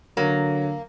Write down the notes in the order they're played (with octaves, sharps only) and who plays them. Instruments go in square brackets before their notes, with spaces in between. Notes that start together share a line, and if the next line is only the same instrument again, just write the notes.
[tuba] D3 [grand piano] F#3 [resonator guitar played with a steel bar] A#3